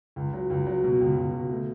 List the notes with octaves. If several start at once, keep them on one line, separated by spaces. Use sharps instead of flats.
C#2
F#3
C#2
F#3
B2
C#2
C#2
B2
A3